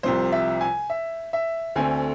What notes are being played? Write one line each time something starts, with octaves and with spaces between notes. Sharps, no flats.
C2 C3 F3 C5
E5
G#5
E5
E5
D2 D3 A3 C4 G#5